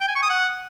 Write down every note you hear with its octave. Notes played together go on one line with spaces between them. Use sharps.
G5
G#5
C#6
D#6
F#5